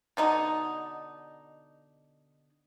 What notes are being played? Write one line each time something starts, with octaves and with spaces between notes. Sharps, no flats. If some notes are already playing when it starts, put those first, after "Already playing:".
B2 D3 D#4